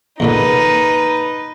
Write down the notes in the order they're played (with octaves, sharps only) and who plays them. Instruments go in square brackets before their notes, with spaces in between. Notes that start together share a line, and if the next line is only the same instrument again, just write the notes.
[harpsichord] E2 A#2 D3 [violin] D#4 B4